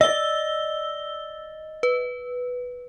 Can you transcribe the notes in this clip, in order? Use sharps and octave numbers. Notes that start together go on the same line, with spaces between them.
D5 D#5 E6 G7
B4